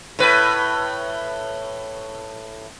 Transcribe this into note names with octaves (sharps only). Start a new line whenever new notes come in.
A2 B4